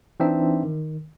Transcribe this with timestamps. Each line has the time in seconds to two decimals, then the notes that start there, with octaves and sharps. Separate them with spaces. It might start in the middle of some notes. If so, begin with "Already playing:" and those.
0.20 E3 C4 D4 D#4 E5
0.64 D#3